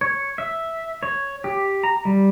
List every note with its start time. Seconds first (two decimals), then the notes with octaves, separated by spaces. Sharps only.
0.01 C#5
0.38 E5
1.03 C#5
1.44 G4
1.83 A#5
2.05 G3